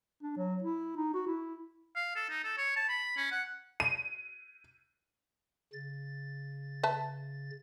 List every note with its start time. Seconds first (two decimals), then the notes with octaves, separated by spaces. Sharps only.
0.23 D4
0.37 F#3
0.62 E4
0.96 D#4
1.14 F#4
1.27 E4
1.96 F5
2.16 A4
2.30 D#4
2.44 A4
2.58 C#5
2.76 A5
2.89 B5
3.17 C#4
3.32 F#5
3.80 D#7
5.73 C#3 A6
6.83 B4 E5 A5